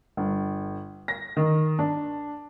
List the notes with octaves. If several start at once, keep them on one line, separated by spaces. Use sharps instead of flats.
G1
A#6
D#3
D4